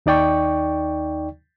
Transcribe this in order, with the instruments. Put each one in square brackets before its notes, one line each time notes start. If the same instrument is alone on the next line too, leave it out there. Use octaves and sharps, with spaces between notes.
[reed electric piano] D#2 D#4 D5 G5 C#6